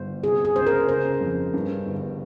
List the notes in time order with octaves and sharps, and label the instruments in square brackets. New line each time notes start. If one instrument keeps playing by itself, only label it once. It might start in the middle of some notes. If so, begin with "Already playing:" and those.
Already playing: [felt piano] G1 [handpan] C5
[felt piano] C3 [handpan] G#4
[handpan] G#4
[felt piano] C#2 [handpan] C5
[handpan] A#4
[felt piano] C#3 [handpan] C5
[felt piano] F2
G2
G1